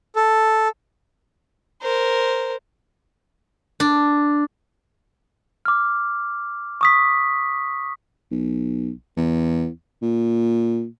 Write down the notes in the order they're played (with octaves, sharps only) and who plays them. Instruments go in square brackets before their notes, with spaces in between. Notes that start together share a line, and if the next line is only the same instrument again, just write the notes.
[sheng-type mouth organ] A4
[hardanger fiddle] A#4 C5
[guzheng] D4
[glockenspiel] D6 F6
C#6 D#6 B6
[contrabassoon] B1
E2
A#2